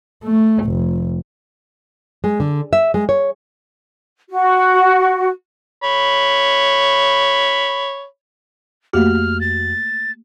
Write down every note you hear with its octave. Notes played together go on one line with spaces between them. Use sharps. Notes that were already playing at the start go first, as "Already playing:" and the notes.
A3
F1
G#3
D3
E5
G#3
C#5
F#4
C#5 B5
F2 A3 A#3 F#4 G4 F6
A6